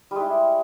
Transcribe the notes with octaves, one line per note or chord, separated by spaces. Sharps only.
G3 G#3 E4